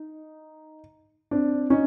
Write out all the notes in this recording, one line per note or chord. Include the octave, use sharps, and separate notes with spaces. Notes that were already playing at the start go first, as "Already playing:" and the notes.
Already playing: D#4
C4 D4
C#4 D#4